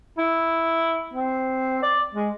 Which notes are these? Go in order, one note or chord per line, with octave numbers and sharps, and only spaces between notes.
E4
C4
D5
G#3